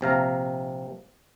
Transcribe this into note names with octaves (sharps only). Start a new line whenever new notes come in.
A#1 C3 F5 A#5